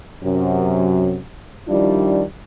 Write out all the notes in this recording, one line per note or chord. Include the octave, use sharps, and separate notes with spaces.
F#2 C3 F#3
D#3 F3 G3 D4 E4 F4